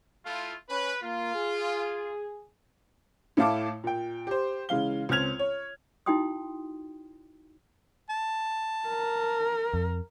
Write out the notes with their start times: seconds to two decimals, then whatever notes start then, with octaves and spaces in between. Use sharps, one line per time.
0.25 A3 E4 F4
0.69 C#4 B4
1.02 A#3 F4
1.34 G#4
3.37 A2 A3 E4 F5 A5 D6
3.84 A#2 G5
4.27 G4 C5
4.69 C#3 E3 G#3 F5 G7
5.09 C#2 C4 C#4 F6 G#6 F7
5.39 C#5
6.06 D#4 E4 F#4 G5 C6 D#6
8.09 A5
8.88 A#4
9.74 F2